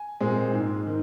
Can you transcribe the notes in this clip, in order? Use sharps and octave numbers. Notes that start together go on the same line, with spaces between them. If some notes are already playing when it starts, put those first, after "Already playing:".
Already playing: G#5
A#2 G#3 C4
G#2
D#3